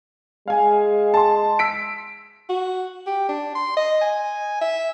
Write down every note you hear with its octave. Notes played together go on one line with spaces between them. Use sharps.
G#3 F5 G#5
A5 C6
E6 B6 D7
F#4
G4
D4
C6
D#5
G#5
E5